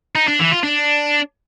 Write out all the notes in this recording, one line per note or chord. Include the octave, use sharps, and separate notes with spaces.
D#4
D4
E3
F4
D4